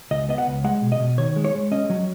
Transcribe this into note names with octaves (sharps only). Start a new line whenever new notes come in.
C#2 D#5
B3 D#5
F#5
C#2
G#3 F#5
B2
D#5
B2
D#3 C#5
G#3
C#5
G#3
C#4 D#5
F#3